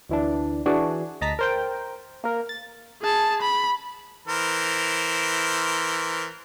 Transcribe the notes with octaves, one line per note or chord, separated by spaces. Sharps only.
D2 E3 D4
E3 D4 F#4 G#4
D2 D#5 A5 A#5 B6
A#4 C5 G5
A#3 A#4
A6
G#4 A5
B5
E3 A#4 C5